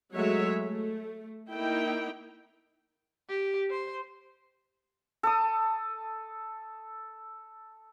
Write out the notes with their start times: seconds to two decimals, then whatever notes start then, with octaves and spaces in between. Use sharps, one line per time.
0.13 F#3 G#3 A3 C#5 E5
0.63 A3
1.51 A#3 D#4 E4 G5
3.29 G4
3.70 C5
5.23 A4 D#6